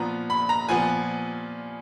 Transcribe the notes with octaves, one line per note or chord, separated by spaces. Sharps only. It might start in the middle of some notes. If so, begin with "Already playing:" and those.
Already playing: A#2 F3 B3 A#5
B5
A#5
A#2 F3 B3 G#5